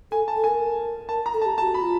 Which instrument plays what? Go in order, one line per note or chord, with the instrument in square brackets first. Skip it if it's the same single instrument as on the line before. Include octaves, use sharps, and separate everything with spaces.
[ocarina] A4 [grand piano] G#5
[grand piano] A5
[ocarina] A4
[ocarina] A#4 [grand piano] G#5
[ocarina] A#4 [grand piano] A5
[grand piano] A#5
[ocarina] A4
[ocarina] G4 [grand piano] A5
[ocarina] F#4 G4 [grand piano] A5
[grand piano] B5
[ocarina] F4